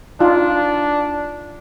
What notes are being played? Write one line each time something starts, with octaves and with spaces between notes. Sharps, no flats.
D4 D#4 F4